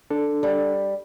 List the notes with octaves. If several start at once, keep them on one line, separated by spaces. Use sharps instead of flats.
D4 A4
G3